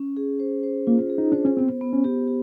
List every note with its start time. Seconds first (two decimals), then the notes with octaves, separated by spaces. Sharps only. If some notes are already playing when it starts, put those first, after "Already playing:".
Already playing: C#4
0.17 G#4
0.39 C5
0.63 C5
0.87 A#3 F4
1.10 G#4
1.18 D#4
1.32 D4 C5
1.45 C#4
1.57 B3 C4
1.81 B3
1.93 C#4
2.04 G4
2.28 G4